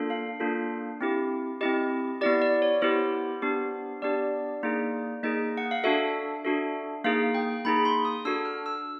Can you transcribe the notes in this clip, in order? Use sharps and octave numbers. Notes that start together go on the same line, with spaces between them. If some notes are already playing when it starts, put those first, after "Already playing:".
Already playing: A#3 D4 F4 A4
F5
A#3 D4 F4 A4
C4 E4 G4
C4 E4 G4 D#5
B3 E4 G4 D5
D5
C#5
B3 E4 G4 C5
B3 D4 G4
B3 D4 G4 D5
A#3 D#4 G#4
A#3 D#4 G#4 D#5
F#5
F5
D4 F#4 A4 E5
D4 F#4 A4
A#3 D#4 G#4 F5
G5
A#3 D#4 G#4 B5
C6
D#6
D4 F#4 A4 E6
F6
E6